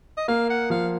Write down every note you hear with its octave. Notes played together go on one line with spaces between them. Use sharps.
D#5
A#3 F5
F#5
F3 F5